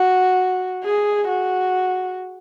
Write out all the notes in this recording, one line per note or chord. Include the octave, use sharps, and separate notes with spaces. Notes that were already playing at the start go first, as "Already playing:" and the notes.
Already playing: F#4
G#4
F#4